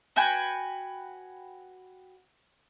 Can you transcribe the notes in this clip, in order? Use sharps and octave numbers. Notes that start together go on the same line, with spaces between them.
F#4 B4 G5 G#5